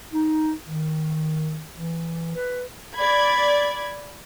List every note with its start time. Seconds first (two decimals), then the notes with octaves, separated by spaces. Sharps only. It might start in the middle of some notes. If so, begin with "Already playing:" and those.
0.13 D#4
0.65 D#3
1.75 E3
2.36 B4
2.96 D5 B5 G#6